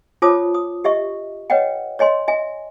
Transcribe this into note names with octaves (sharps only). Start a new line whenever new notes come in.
F4 C5 C#5 A5 D6 D#6
D#6
G4 D#5 E5 C#6
B4 C#5 D#5 F#5 G5
C#5 D#5 G#5 C6
D#5 E5 G#5